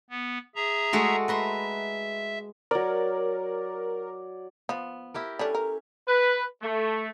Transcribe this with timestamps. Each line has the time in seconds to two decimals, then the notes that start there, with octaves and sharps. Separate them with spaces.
0.10 B3
0.55 G#4 E5 A#5
0.93 G#3 A3 F#4
1.28 B4 E5 A#5 C6
2.71 F#3 A#4 D5
4.69 F3 B3
5.14 E4 G4 A#4
5.39 G3 C#4 D4 A4
5.55 A#4
6.08 B4
6.62 A3